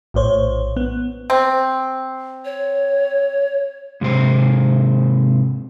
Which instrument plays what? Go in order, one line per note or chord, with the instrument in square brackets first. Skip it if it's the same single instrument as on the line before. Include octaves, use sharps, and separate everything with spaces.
[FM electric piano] A#1 A2 C5 C#5
B3
[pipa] C4
[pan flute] C#5
[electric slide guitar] G#2 C3 C5